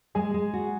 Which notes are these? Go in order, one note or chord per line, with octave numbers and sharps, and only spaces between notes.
G#3 G#4 G#5
G#3
F#4